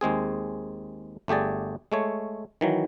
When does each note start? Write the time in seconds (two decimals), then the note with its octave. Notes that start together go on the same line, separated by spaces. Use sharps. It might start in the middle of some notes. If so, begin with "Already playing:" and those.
0.01 D#2 G#3 C4 G#4
1.28 G1 A3 G4 G#4 D5
1.92 G#3 A3 C#5
2.61 D#3 E3 F#3